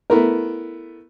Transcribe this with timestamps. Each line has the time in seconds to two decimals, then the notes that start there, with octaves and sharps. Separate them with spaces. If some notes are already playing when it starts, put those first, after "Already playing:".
0.10 A3 B3 E4 A#4